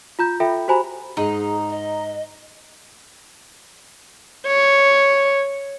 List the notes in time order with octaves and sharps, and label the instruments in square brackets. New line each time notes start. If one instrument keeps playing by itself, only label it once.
[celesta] F4 A#5 G6
F4 A4 E5 G5 B5
F#4 G4 C5 G#5 A#5 B5
[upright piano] G#2 [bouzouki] D#4 [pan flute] G#4
[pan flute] D#5
[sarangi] C#5